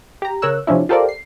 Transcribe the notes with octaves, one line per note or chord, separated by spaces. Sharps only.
G4 A#5
C#3 A#4 C#5 E6 F#6
C3 F3 C#4 D4 E4
F4 G4 A4 A#4 C5 D5
C7